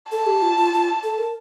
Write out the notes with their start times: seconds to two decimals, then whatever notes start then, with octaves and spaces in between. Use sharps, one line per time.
0.12 A4 A5
0.26 G4
0.42 F4
0.57 F4
0.73 F4
1.03 A4
1.18 A#4